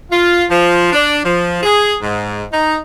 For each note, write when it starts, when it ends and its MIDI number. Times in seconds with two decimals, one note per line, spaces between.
0.10 0.44 65
0.50 0.90 53
0.92 1.19 62
1.24 1.60 53
1.63 1.96 68
2.02 2.43 44
2.52 2.77 63